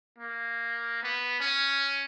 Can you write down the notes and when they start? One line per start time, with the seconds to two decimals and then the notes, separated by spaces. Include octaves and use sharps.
0.18 A#3
1.03 B3
1.40 C#4